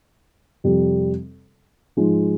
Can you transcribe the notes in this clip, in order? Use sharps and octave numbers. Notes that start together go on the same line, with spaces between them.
F2 C3 G3
G#2 F3 G#3